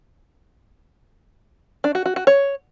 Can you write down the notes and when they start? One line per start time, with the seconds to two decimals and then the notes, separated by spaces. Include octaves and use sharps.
1.84 D4
1.95 F#4
2.06 F#4
2.16 F#4
2.27 C#5